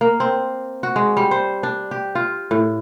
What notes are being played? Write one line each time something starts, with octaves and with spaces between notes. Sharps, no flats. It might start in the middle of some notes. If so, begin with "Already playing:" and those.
A#3
C4
F#4
G#3
G3
C5
D4
G4
F4
A2